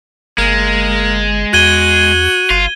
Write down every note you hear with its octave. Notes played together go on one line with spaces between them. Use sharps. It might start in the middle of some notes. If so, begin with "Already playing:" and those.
G1 G#3 A#3
E2 F#4 G#6 D#7 G7
G1 F4